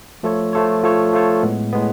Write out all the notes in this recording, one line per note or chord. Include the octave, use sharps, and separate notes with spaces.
F3 A3 F4 A4 C#5
F3 A3 F4 A4 C#5
F3 A3 F4 A4 C#5
F3 A3 F4 A4 C#5
A2 G#3 B3
A2 G#3 B3